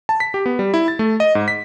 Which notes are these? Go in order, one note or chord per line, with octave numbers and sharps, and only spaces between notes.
A5
B6
G4
B3
G3
E4
A6
A3
D#5
G#2
B6